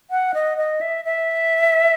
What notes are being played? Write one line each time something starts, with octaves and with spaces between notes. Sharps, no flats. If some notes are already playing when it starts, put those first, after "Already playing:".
F#5
D#5
D#5
E5
E5